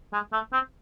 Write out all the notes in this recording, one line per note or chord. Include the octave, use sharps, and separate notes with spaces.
G#3
A3
C4